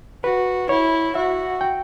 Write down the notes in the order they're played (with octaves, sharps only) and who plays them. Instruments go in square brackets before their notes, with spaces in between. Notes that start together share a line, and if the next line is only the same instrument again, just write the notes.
[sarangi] F#4 [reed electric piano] B4
[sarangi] E4 [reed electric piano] C#5
[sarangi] F#4 [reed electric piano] E5
[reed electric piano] G5